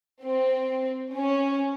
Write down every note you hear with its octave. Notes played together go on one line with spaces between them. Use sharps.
C4
C#4